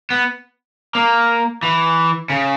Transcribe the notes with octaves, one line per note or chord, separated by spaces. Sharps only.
B3
A#3
E3
C#3